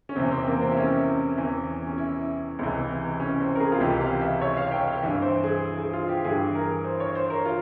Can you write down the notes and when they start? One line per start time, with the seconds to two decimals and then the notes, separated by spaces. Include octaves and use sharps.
0.09 C#4
0.16 E2 C3 E3 C4
0.31 C4
0.46 A#3
0.61 C4
0.71 E4
0.77 C#4
1.38 E2 E3
1.87 C#4
1.98 E4
2.59 C#2 C3 E3
3.20 C#4
3.40 C4
3.55 A#4
3.60 G#4
3.72 F4
3.80 C#2 C3 E3 G4
4.01 F5
4.21 E5
4.41 C#5
4.57 F5
4.72 G5
4.87 F5
5.02 G2 E3 E5
5.22 C5
5.44 G#4
5.78 G#4
5.93 F4
6.09 G4
6.24 G2 E3 G#4
6.55 A#4
6.85 C5
7.00 C#5
7.15 C5
7.26 C5
7.30 A#4
7.46 F4